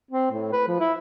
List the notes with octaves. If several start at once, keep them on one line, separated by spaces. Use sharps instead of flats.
C4
A2
B4
F3
E4